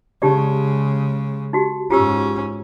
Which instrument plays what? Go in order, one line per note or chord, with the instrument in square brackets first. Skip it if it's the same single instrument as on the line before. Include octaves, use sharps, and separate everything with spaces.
[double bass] C#3 G#3 [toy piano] D#4 G4 D5
[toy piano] D#4 F#4 G4
[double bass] G#2 C#4 [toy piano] F4 G4 E6